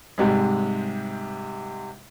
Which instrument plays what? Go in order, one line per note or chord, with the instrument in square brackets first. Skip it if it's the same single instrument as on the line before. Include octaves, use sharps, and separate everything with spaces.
[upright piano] G#2 C3 G3 G#3